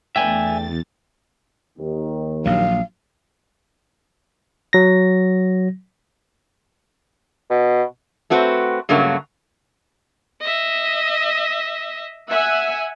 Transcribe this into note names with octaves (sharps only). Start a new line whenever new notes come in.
E2 A3 B3 D4 E5 G5 G#5 A6
D#2 D#3
A#1 F#3 F5
F#3 A#6
B2
A3 C4 F#4 B4 C5
G2 C#3 F#3 A3 A#3 F#4
D#5 E5
E5 F#5 G#5